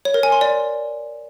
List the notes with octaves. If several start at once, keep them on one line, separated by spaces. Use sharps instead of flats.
C#5
A#4
G#5
C6
D5